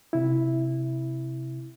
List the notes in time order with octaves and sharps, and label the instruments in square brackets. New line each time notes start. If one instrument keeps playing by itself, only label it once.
[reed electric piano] C3 E4